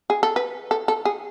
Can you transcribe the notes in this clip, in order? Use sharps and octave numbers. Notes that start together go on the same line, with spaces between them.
G#4
A4
B4
A4
A4
G#4